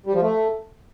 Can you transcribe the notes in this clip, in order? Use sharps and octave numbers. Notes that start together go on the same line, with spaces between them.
G3
F3
A3